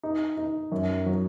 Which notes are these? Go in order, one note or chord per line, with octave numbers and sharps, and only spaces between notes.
D#4
D#4
F#2
F#3